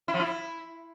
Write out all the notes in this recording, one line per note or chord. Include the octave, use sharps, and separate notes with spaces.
E4
F3
E4